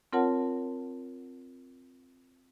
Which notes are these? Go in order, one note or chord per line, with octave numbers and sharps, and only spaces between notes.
C4 F4 A#4 C#5 F#5 A5